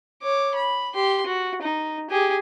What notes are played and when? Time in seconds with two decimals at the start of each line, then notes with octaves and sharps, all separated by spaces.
0.23 C#5 D6
0.55 B5
0.95 G4 C6
1.26 F#4
1.62 D#4
2.10 G4 G#4